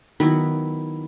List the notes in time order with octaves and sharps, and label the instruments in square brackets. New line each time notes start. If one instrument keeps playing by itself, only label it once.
[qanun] D#3 F#3 B3 E4 B4